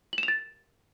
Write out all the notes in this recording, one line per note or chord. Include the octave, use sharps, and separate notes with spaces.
F#7
E7
F7
A6